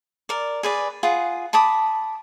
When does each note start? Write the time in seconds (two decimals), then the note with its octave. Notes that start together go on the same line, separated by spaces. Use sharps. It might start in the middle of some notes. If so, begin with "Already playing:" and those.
0.29 A#4 D5
0.63 G#4 B4 D5
1.03 F4 G#4 F#5
1.53 A5 B5 D6 D#6